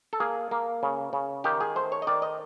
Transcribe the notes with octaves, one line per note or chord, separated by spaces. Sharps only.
A4
A#3 G#4
A#3
C#3
C#3
D#3 G4
G#4
A3 C5
C#5
D#5
D#3 D5
D#5